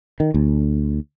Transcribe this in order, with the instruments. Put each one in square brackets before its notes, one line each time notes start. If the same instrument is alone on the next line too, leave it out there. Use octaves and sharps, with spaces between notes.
[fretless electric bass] D#3
D2